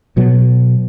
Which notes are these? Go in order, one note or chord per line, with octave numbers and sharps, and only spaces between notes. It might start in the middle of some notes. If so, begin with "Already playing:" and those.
B2 F#3